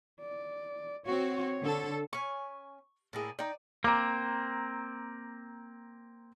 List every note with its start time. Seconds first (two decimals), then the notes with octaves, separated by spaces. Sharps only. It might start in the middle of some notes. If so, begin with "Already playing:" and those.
0.20 D5
1.06 C4 F#4 C#5
1.62 D3 A4
2.13 C#4 G#5 C#6
3.13 A2 A#3 E4 G#4 D5
3.39 D#4 D5 G5
3.84 A#3 C4 A#5 D6